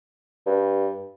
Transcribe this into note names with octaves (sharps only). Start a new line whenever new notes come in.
G2